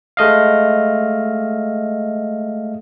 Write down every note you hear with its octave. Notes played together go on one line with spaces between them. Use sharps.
G#3 A3 D#5 F5